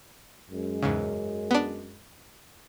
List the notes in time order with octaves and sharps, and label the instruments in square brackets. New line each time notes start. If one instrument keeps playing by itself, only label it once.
[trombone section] F#2 G#3
[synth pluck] E2 G#2 C#3
B3 D4